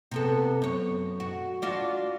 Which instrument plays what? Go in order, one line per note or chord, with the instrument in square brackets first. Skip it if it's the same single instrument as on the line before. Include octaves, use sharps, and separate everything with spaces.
[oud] C3 B3 A4
F#2 C#5
F#4
D4 F4 F#4